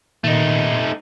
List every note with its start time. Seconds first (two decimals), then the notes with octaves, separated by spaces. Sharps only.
0.24 A#2 D#3 A3 D#4